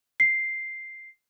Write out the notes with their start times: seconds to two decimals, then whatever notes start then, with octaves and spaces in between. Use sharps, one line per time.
0.20 C7